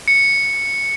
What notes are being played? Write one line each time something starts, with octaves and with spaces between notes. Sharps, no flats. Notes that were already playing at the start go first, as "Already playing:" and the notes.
C#7